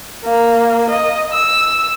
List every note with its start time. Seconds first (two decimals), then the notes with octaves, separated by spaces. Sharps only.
0.24 A#3
0.90 D#5
1.33 E6